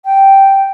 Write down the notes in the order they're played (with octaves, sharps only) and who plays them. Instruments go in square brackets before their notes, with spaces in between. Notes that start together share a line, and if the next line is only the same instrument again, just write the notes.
[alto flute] G5